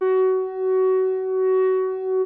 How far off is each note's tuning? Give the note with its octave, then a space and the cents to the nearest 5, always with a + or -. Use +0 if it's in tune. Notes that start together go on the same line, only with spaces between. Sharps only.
F#4 +25